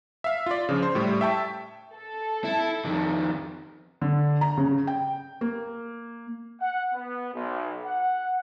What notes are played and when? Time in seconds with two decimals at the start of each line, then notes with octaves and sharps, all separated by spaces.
0.24 E5 F5
0.46 F4 D5
0.69 C#3 F3 D4
0.83 C5
0.95 A2 G3 E4
1.21 E5 G5 A5 C#6
1.94 A4
2.44 E4
2.85 F2 D#3
4.02 D3
4.41 A#5
4.57 C#3
4.87 G5
5.41 A#3
6.61 F#5
6.93 B3
7.33 B1
7.84 F#5